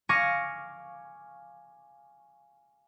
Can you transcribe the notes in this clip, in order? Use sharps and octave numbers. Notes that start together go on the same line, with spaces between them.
F5 G#5 C#6 D6 A#6